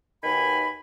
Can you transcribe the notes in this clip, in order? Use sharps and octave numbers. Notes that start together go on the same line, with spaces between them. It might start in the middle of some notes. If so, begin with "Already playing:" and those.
D#2 B2 D#3 G#5 B5